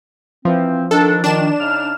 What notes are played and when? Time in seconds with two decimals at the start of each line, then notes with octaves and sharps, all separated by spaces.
0.45 E3 F3 C4
0.91 D#3 D4 A4
1.24 D#3 D4 E7
1.60 C#3 D#4 F6